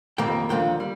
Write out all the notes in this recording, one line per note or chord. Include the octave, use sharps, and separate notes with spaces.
F2 D#3 G3 A#3 G5
D#2 D3 F3 A#3 G5
G3